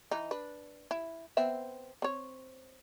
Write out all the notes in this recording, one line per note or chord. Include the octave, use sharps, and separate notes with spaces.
E3 D#4
D4 B4
E4
B3 C4 E5
C4 C#5